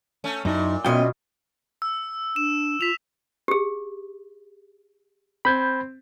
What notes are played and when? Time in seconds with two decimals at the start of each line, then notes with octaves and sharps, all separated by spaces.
0.24 A3 C#4
0.45 F#2 A#2 D#4 E4
0.85 F#2 B2 B3 C#4 F4 D#5 G5
1.82 E6
2.36 D4 E7
2.81 F4 B6 F7
3.48 G4 G#4
5.45 C4 B5 G6 G#6